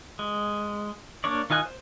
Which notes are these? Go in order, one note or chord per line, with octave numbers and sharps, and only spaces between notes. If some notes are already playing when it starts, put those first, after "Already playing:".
G#3
A#3 D4 C#5 D5
D#3 F4 D#5 G#5 F#6
C5